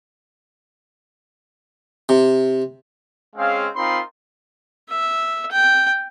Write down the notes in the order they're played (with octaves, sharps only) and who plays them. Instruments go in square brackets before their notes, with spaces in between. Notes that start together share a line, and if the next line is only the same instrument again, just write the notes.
[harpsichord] C3
[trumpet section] G#3 C4 C#4 G#4 F5
C4 D#4 F4 A#4 B5 C6
[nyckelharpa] E5
G5